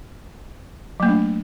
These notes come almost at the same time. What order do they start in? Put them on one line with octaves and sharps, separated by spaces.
F#3 A#3 A3 D4